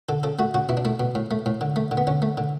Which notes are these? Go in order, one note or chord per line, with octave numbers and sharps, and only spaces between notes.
D3 A4
C#3 A4
A3 F#4
C#3 F#4
B2 E4
D4
A3 E4
B2
A2
A3
A2
D3
A3
D3
B3
D3 C#4
A3
D3